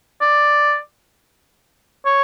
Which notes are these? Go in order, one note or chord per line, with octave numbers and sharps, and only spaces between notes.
D5
C#5